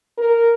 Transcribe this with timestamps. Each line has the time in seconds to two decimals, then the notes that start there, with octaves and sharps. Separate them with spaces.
0.18 A#4